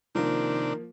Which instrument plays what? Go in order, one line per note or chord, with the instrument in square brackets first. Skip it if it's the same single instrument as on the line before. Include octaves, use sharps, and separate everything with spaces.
[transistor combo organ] C3 D4 [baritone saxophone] D#3 [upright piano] F3 A#3